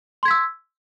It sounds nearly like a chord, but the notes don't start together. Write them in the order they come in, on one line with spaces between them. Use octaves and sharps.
C6 G#6 B6 E6